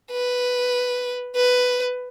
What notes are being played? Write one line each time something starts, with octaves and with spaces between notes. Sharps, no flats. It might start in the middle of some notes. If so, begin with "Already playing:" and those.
B4
B4